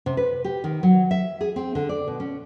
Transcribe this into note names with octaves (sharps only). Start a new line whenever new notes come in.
C3
B4
G4
D#3
F#3
E5
G#4
C4
D3
D5
B2
C#4